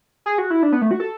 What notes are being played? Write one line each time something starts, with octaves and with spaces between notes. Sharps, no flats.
G#4
F#4
E4
D4
B3
A3
F#4
A4